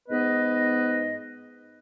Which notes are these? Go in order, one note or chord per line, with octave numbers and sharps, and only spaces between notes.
G#2 B3 B4 D#5